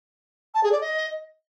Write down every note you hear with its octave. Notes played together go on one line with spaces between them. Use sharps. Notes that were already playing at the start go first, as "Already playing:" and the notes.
A5
G#4
D5
D#5